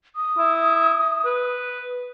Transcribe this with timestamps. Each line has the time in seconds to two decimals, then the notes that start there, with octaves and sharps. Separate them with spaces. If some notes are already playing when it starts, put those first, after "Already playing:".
0.16 D#6
0.38 E4
1.25 B4